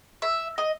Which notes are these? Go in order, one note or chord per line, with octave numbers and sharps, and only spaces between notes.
E5
D#5